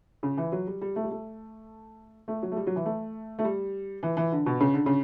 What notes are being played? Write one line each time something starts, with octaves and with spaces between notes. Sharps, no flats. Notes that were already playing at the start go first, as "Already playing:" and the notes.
C#3
E3
F#3
G3
G3
A3
G3
A3
A3
F#3
A3
G3
F#3
E3
A3
A3
G3
E3
E3
D3
B2
C#3
D3
C#3